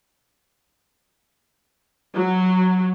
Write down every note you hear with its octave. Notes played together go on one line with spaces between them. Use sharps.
F#3